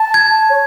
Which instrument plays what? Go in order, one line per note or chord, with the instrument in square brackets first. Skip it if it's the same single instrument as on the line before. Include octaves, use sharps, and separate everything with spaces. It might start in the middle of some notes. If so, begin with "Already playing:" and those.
Already playing: [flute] A5
[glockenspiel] G#6
[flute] C#5